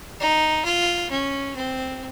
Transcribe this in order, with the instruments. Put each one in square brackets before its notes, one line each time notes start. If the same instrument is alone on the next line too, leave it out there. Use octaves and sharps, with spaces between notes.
[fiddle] D#4
F4
C#4
C4